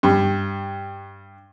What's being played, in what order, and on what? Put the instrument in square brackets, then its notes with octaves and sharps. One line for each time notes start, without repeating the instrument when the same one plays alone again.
[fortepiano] G2